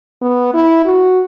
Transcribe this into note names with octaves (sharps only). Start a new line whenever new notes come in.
B3
E4
F#4